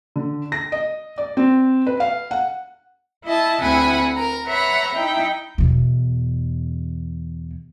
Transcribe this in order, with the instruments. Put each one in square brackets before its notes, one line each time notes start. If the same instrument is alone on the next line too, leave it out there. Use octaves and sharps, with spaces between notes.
[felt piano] D3
A#6
D#5
D5
C4
B4
F5
F#5
[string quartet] E4 D#5 A5
D2 C4 E4 F#5 G#5 B5
A#4 A#5
B4 C#5 E5 F#5 A#5 B5
D#4 E4 G5
[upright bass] E2 B2